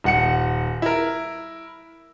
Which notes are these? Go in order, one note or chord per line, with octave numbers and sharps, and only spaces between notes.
D#1 F#5 C#7
E4 A#4